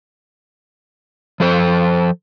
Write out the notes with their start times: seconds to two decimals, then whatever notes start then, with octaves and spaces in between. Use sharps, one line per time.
1.40 F3 A4 C5